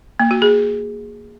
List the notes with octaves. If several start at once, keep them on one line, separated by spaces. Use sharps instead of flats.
A#3
F#4
G#4